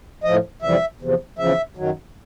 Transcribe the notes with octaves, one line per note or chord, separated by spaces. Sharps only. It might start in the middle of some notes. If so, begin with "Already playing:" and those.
A2 F3 D#5
F2 C3 E3 G3 E5
E2 C3 F3
E2 C#3 F3 E5
F#2 D#3 F#3